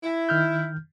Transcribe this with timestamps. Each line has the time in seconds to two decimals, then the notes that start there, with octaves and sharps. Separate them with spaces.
0.04 E4
0.29 D#3 F6 G6